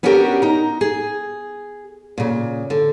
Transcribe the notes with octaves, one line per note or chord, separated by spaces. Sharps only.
B3 C#4 D4 F#4 G4 A#4
D#4 A#5
G#4
A#2 C#3
D3